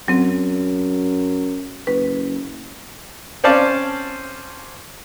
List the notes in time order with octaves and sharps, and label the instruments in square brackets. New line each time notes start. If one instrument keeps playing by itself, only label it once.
[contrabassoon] F#2 [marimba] F#3 C4
[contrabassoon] F#1 [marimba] B4
[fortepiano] C4 C#4 C5 D5 F5 A5